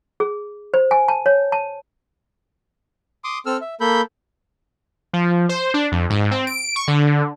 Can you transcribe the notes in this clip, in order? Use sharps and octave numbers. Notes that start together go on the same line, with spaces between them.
G#4
C5
G#5
A5
C#5
A5
C6 D6 D#6
C4 A4 E6 F6
E5
A#3 A4 B5 G6
F3
C5
D4
F2
G#2
C4
D7
C#6
D3